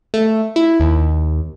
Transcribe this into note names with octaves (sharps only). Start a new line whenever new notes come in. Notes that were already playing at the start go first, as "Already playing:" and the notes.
A3
E4
D#2